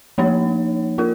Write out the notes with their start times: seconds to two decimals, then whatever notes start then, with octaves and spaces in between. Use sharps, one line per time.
0.18 F3 A#3 D#4 C#5
0.98 A#3 F4 A#4